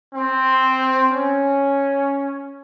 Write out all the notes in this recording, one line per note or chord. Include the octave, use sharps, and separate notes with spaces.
C4
C#4